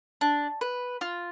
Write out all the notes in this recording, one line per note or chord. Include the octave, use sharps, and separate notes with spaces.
D4
B4
F4